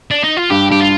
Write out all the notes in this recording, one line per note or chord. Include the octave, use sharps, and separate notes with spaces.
D4
D#4
F4
G2 G4
G2 G4
F4